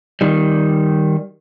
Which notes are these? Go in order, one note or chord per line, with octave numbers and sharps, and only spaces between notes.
D#3 G3